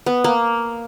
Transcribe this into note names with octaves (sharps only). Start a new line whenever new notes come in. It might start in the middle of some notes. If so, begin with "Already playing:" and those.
B3
A#3